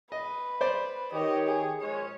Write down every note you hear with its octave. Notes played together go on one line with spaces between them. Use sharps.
B4 D#5
C5 D5
D#3 G4 C#5 D#5
G#4
A#1 G#3 C#4 C#5